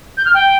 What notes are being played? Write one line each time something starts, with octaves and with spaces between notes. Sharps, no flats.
G6
F6
G5